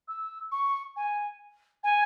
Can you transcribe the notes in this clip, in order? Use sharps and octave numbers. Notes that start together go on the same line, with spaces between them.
E6
C#6
G#5
G#5